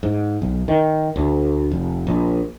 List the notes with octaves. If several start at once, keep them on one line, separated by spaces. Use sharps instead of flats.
G#2
B1
D#3
D2
F1
A#1